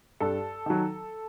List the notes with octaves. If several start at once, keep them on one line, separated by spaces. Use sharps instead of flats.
G2 A4
D#3 F#3